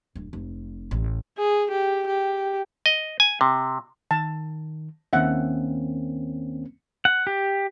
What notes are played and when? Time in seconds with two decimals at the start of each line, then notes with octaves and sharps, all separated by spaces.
0.16 D1
0.33 F1
0.91 A1
1.38 G#4
1.71 G4
2.07 G4
2.86 D#5
3.20 G#5
3.41 C3
4.11 D#3 A5
5.13 D#2 D#3 A#3 C4 C#4 E5 F#5
7.05 F#5
7.27 G4